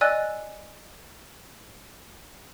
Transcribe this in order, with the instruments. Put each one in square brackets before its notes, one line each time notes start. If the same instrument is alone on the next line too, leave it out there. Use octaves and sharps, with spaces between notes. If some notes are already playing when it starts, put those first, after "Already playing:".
[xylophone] D5 D#5 G#5 E6 F#6